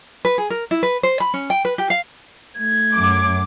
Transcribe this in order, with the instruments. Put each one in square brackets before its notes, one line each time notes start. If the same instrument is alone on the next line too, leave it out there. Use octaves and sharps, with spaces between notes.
[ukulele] B4
G#4
A#4
E4
B4
C5
B5
C#4
G5
B4
G4
F5
[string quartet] A3 G#6
[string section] F#2 D6